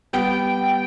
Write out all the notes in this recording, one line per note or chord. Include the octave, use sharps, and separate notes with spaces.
G3 B3 G5